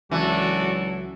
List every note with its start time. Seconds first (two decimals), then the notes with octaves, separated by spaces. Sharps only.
0.11 C#2 E3 F#3 D4 F#4 A4